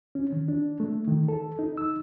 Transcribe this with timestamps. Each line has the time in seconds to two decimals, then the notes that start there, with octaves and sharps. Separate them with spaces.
0.15 C#4
0.32 D#3
0.48 D4
0.80 A3
1.07 D#3
1.28 A4
1.59 D#4
1.78 E6